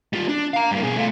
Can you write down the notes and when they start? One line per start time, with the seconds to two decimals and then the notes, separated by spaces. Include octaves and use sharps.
0.13 G3 F4
0.28 D4
0.54 F5 A#5
0.71 G2 A#3
0.83 B2 G#4
0.96 A3 F4